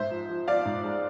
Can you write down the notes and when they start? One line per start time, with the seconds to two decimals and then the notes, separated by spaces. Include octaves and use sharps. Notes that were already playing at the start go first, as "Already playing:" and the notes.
Already playing: G#2 C5 E5
0.11 F3
0.29 F3
0.48 F3 D5 F5
0.65 G#2
0.84 G#3